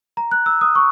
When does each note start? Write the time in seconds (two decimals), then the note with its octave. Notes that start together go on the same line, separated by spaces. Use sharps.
0.17 A#5
0.31 F#6
0.46 E6
0.61 D#6
0.75 C#6